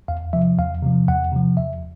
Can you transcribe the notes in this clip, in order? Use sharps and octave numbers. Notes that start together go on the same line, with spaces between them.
E2 F5
C3 F3 E5
E2 F5
C3 F3
E2 F#5
C3 F3
E2 E5